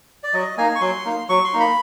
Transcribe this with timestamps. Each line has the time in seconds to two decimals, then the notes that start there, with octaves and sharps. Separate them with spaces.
0.23 D5
0.33 F#3 D#5
0.57 A#3 D#4 G#5
0.76 C#6
0.81 F#3 C6
1.05 A#3 D#4
1.29 F#3 C#6
1.44 C6
1.53 A#3 D#4
1.60 B5